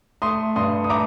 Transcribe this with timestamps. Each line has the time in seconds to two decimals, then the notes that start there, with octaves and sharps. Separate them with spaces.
0.22 A3 C6 D#6
0.56 G2 C6 D#6
0.84 D#6
0.90 A3 A#5 D6